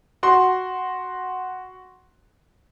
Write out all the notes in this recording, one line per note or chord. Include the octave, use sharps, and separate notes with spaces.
F#4 C6